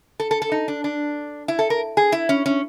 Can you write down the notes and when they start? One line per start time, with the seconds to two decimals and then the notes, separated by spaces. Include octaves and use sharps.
0.20 A4
0.31 A4
0.42 A4
0.52 D#4
0.68 D4
0.84 D4
1.48 E4
1.59 A4
1.70 A#4
1.97 G#4
2.12 E4
2.29 C#4
2.46 C#4